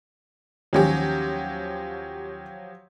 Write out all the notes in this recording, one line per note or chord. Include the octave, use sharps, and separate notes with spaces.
D#2 F3 F#3 C#4 G4